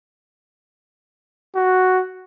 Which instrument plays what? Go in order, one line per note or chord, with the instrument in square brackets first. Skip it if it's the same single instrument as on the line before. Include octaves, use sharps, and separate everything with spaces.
[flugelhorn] F#4